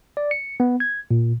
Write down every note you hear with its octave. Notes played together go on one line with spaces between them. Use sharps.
D5
C#7
B3
G#6
A#2